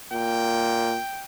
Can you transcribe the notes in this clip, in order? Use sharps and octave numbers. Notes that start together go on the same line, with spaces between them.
A#2 G5